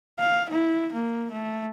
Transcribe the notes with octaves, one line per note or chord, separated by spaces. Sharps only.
F5
E4
A#3
A3